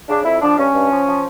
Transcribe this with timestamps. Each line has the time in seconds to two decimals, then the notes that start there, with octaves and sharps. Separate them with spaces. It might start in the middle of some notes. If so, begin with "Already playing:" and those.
0.08 C#3 D4
0.24 F2 E4
0.40 F3 D4
0.57 G2 C#4
0.73 G2
0.91 F3
1.07 F3